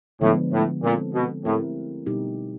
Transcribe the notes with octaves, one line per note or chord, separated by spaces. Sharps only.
A2 D3 F3 G#3 B3 D4
A2
A#2 G#3 C4 E4 A4
B2
A2 A3 C4 E4 G4 A#4
B2 G3 B3 D#4 G4